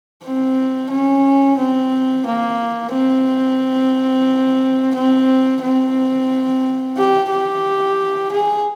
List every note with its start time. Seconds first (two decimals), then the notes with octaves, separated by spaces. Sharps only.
0.24 C4
0.91 C#4
1.58 C4
2.26 A#3
2.93 C4
4.95 C4
5.62 C4
6.97 G4
7.30 G4
8.31 G#4